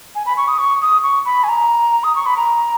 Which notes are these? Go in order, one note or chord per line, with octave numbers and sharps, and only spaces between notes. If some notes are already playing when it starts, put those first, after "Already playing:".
G#5
B5
C#6
D#6
C#6
D#6
C#6
B5
G#5
A#5
D#6
C#6
B5
A#5